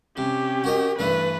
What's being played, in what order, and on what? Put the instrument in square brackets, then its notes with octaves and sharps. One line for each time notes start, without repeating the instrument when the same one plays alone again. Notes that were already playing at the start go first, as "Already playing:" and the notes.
[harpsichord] C3 [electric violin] C#4 G4
[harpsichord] F#4 A#4 D#5
[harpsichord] G2 E3 A3 [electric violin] B4